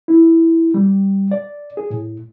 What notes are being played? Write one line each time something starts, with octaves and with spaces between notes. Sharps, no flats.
E4
G3
D5
G#4
A2